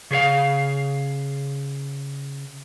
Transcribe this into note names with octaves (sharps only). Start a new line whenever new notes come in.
C#3 G#4 C5 F5